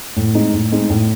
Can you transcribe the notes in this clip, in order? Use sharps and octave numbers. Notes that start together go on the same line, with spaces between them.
A2
G#3 C4 D#4
A2
G#3 C4 D#4
A2